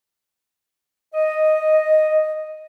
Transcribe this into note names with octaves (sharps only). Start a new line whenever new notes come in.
D#5